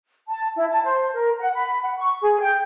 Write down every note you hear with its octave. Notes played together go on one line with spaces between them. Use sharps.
A5
E4
A5
C5
A#4
F#5
B5
F#5
C#6
G#4
G5